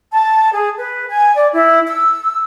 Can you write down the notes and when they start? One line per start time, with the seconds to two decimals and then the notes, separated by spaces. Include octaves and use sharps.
0.12 A5
0.53 G#4
0.77 B4
1.09 G#5
1.35 D5
1.53 E4
1.87 E6